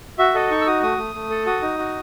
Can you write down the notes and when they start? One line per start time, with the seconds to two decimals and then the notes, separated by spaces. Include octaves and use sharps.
0.19 F#4 E5
0.35 A4 D#5
0.51 D#4 C#6
0.61 E6
0.67 F#4 D#6
0.83 A3 D#6
0.98 A3
1.15 A3
1.30 A4
1.46 F#4 D#6
1.62 D#4
1.78 F#4